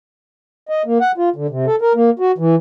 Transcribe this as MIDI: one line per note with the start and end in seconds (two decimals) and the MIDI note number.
0.69 0.82 75
0.86 0.98 58
1.01 1.12 78
1.18 1.29 65
1.36 1.47 50
1.50 1.66 48
1.67 1.76 69
1.81 1.93 70
1.95 2.10 58
2.19 2.32 66
2.38 2.55 52